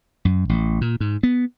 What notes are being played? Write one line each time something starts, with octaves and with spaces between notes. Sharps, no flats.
F#2
A1
A#2
G#2
B3